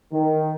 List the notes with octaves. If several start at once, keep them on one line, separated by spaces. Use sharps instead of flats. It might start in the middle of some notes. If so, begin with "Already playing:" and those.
D#3